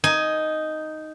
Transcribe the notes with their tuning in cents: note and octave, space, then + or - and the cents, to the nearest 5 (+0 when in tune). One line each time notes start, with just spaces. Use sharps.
D#4 +0 G#5 +10